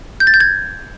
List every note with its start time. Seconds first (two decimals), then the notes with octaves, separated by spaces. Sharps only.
0.20 G6
0.27 A6
0.34 G6
0.40 G#6